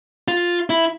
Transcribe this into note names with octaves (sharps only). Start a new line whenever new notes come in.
F4
E4